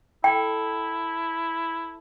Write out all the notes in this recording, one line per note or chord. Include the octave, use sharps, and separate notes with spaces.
E4 A4 C5 G5